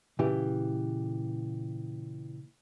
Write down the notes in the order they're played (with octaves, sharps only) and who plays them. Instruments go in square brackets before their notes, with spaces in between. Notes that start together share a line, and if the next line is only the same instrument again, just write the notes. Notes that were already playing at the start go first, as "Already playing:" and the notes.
[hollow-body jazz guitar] A#2 C#3 E3 G4